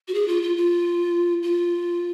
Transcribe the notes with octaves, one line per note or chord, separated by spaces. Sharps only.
F#4
G#4
F4
F4
F4
F4